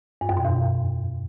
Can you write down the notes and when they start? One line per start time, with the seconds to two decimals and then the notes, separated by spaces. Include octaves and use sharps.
0.21 G2
0.29 F#2
0.37 B2
0.45 E2